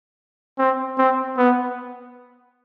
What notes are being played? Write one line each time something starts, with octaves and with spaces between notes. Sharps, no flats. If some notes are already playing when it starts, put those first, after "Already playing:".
C4
C4
B3